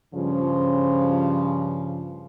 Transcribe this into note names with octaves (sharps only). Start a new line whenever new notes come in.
G2 C#3 F3